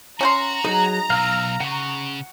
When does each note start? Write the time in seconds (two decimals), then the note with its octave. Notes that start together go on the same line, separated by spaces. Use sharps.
0.21 C#4 F#4 G5 A#5 C6
0.65 F#3 D#4 G#4
1.10 B1 F5 E6
1.61 C#3 F#5 C#6